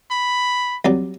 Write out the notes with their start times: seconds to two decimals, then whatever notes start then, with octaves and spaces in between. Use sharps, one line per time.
0.11 B5
0.85 C2 F#3 D5